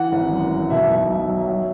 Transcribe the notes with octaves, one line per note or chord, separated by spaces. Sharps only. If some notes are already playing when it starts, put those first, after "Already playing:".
Already playing: E3 F#5
G#1
F#2
F#2
B2 E5
B1
B1
F#3
F#3